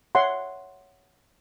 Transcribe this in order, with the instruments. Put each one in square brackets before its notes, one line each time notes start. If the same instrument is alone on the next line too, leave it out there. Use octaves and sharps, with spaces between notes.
[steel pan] C#5 E5 F#5 C6